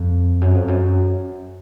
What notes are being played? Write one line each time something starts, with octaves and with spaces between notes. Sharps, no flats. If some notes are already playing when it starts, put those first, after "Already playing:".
Already playing: F2
F#2
F2
F#2